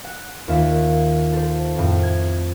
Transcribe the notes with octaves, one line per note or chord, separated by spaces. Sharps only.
F#5
D#2 F4 E5
A4 C5
F2 A2
G#6